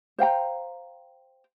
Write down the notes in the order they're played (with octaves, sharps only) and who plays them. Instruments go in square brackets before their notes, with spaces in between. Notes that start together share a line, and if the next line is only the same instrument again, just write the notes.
[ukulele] C5 F5 G5 A#5